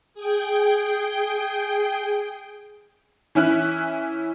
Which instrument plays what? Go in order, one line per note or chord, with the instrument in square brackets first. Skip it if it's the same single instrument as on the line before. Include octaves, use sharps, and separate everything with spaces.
[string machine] G#4 G5
[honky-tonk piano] E3 C#4 E4 F#6